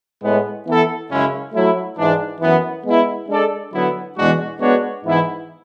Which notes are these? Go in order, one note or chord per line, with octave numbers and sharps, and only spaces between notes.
A2 G#3 B3
E3 B3 E4 A4
F#2 C#3 G#3 C#4 E4
F#3 A3 E4
G#2 E3 G#3 D4
F#2 E3 B3
G#3 B3 E4
G#3 D4 A4 D5
D3 F#3 B3 E4
E2 B2 G#3 D4 F#4
G#3 B3 D4 F#4 C#5
G#2 E3 B3 E4